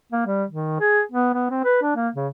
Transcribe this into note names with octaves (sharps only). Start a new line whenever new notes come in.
A#3
G3
D#3
G#4
B3
B3
C4
B4
D4
A#3
C#3